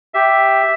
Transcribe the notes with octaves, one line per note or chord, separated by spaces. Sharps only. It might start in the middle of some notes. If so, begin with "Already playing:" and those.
G4 E5